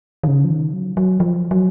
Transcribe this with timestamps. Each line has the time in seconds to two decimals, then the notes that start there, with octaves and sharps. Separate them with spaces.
0.23 D#3
0.27 C#3
0.44 F3
0.50 D#3
0.74 F#3
0.97 F#3
1.20 F3
1.51 F#3